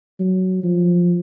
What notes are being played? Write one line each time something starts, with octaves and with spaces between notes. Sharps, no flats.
F#3
F3